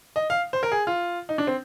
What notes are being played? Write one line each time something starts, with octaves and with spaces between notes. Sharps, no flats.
D#5
F5
C5
A#4
G#4
F4
D#4
D4
C4